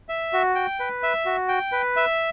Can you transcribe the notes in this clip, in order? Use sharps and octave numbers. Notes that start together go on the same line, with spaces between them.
E5
F#4
G5
B4
E5
F#4
G5
B4
E5